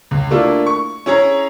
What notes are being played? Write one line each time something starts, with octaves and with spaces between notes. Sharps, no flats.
C#2
A3 A#3 D4 E4 F4
C#6
C#4 E4 G#4 C#5 A#5